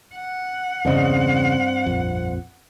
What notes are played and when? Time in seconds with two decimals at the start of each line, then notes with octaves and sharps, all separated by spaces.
0.15 F#5
0.85 E2 G2 C#3 C4 D#5
1.86 A#1 F2